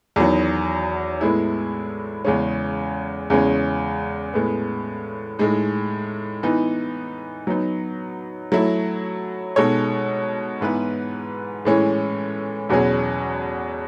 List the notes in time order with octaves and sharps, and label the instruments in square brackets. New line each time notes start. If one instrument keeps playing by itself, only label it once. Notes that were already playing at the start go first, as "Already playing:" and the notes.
[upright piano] E2 D#3 F#3
A2 G#3 B3 E4 G#4
E2 C#3 G#3 C#4
E2 C#3 G#3 C#4
A2 G#3 B3
A2 G#3 D#4
E3 B3 D#4
F#3 B3 D#4
F#3 A3 E4
B2 G#3 D#4 A4 C#5
G#2 E3 B3 E4 B4
A2 E3 G#3 C#4
E2 B2 F#3 C#4 G#4